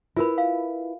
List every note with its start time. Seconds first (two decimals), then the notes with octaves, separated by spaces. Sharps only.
0.17 E4 F4 A#4 B4 B5
0.38 F5